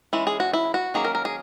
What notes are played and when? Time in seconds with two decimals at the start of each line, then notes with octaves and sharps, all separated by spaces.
0.13 E3 G#3 C#4 E4
0.27 G#4
0.40 F#4
0.53 E4
0.74 F#4
0.94 D#3 F#3 A#3 C#4 G#4
1.04 A#4
1.15 A#4
1.25 G#4